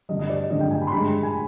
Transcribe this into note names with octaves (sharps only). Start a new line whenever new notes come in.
G2 D3 G3 D#5
D#5
D5
G2 D3 G3 D#5
G5
G#5
B5
C6
G2 D3 G#3 B5
G#5